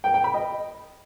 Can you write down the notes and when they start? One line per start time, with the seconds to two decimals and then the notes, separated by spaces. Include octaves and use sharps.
0.04 G5
0.14 G5
0.24 B5
0.34 D#5